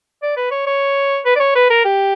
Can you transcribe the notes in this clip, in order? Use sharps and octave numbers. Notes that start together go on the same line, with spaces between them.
D5
B4
C#5
C#5
B4
D5
C#5
B4
A#4
G4